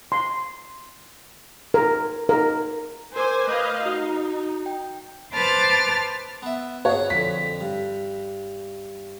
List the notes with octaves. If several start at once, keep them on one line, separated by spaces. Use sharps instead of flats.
C6
A#4
A#4
A#4 C5 G#5 D6
A3 B4 D#5 F5 G6
D#4 F#4
G5
B4 C5 A5 D6 F6 A6
B3 E5
F#4 G#4 C#5
F2 D3 B6
G2